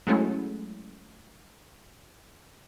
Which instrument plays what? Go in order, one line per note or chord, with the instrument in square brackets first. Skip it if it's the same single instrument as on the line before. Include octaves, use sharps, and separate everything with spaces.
[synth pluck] F#3 G#3 A3 C#4 E4 A4